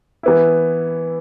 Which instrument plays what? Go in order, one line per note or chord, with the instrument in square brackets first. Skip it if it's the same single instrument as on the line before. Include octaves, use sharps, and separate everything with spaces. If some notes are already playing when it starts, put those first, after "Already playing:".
[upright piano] E3 B3 E4